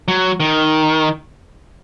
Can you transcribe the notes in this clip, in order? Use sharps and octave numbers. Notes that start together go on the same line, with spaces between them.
F#3
D#3